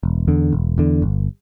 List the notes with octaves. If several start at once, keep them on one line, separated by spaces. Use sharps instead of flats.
E1
E2 D3
E1
E2 D3
G1